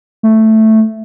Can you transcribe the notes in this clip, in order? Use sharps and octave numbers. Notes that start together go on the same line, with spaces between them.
A3